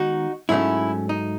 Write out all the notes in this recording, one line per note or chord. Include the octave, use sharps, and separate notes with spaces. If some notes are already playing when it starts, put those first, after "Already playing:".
Already playing: D#3 G#3 B3 D#4 F#4
G#2 F#3 A3 C#4 E4
D#4